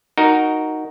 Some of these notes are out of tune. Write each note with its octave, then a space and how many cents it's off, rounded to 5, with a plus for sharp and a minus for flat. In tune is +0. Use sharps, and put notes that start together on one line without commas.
D#4 +0 F#4 +0 A#4 +0